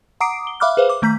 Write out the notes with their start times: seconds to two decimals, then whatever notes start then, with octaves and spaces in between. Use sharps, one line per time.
0.21 F#5 A#5 D6 D#6 C7 D7
0.47 G7
0.60 E5 F5 B5 D6 F6 F#6
0.77 G#4 B4 C5 F5
0.90 D6
1.02 D#3 A3 A#5 G6 B6